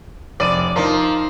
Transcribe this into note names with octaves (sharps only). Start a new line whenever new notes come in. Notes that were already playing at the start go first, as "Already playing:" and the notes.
F1 D5 D#7
F3 D#4 A#4